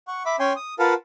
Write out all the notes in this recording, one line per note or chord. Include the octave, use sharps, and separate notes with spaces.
F#5 C#6
E5 B5 D6
C#4 C#5 G5 G#5 C6
D#6
F4 A#4 B4 F5 F#5 A5